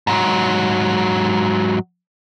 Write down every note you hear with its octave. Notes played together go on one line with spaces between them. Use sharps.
G#2 F#3